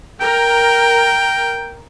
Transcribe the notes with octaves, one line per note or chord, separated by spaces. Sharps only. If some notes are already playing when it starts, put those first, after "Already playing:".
A#4 G5